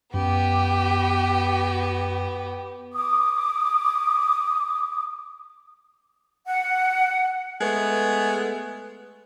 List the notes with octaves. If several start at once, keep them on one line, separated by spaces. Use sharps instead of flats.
F#2 B3 G4
D6 D#6
F#5
G#3 A3 B3